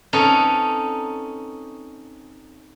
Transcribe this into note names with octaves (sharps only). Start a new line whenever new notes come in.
C4 C#4 D#4 A4 B4